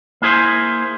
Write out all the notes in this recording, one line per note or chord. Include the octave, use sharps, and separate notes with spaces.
A#3 E4 G#4 C5